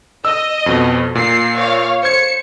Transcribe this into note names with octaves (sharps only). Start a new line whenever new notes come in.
D#5 E6
F2 B2
A#2 C7
C#5 F5
C5 G#6 C#7